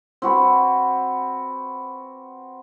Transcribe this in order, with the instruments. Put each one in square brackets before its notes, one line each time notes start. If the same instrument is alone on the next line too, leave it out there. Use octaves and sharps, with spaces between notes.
[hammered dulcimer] C4 F#4 B4 B5